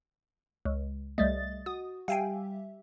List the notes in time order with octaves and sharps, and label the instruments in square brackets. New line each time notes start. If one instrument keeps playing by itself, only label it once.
[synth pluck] C#2
[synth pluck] C2 G3 A3 [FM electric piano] D#5 A6
[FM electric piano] F#4 [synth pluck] D#6
[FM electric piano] G3 G4 E5 [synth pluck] F5 G5 G#5